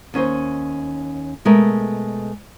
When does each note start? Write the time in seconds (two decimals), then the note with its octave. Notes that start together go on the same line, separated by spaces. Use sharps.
0.14 D#2 C#4 D#4 C5
1.45 B2 G#3 A3 A#4 E5